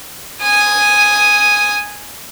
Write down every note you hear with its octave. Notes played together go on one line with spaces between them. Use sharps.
G#5 D#6